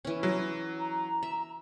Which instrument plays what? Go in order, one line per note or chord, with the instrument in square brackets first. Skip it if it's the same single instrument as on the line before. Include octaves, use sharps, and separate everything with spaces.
[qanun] E3 C#4
[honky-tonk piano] F#3
[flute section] A#5
[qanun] E5